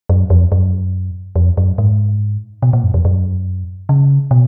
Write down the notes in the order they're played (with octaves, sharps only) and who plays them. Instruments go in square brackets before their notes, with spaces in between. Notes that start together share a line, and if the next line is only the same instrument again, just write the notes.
[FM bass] F#2
F2
F#2
F2
F#2
G#2
B2
A#2
F#2
F2
F#2
C#3
B2